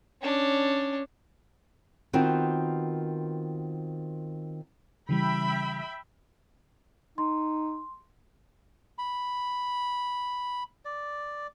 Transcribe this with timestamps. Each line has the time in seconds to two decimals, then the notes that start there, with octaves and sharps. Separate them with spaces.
0.22 C#4 D4
2.13 D#3 B3 C4 F4 F#4
5.09 C#3 E3 G3 E5 G5 B5
7.18 D#4 C6
8.98 B5
10.85 D5